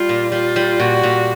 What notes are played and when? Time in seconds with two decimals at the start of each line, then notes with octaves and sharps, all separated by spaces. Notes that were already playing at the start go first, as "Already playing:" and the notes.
Already playing: G3 F4
0.09 A#2
0.32 G3 F4
0.56 G3
0.79 A#2 F#4
1.03 A#2